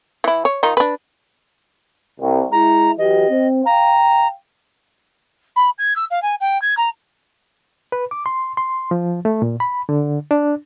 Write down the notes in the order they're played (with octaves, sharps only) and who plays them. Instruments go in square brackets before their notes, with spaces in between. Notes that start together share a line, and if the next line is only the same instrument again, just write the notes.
[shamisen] E3 E4
C#5
D#3 D#4 F4
D4 B4
[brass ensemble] C2
[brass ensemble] G#3 E4 [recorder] A#5
[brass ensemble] E3 F#3 G4 [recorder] D#5
[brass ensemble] C4
[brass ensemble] F5 G5 [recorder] A#5
[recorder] B5
G#6
E6
F5
G#5
G5
G#6
A#5
[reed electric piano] B4
D6
C6
C6
F3
A3
A#2
B5
D3
D4